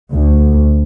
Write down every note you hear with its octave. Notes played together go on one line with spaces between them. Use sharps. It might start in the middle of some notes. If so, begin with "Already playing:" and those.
D2